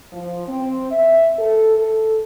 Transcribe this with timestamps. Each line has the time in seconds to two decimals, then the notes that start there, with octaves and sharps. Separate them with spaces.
0.13 F3
0.48 C4
0.91 E5
1.39 A4
1.78 A4